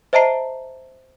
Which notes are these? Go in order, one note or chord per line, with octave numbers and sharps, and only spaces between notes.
C5 D#5 E5 A5 A#5 C7